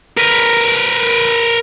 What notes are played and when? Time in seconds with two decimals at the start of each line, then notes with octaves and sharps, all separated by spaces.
0.17 A#4 B4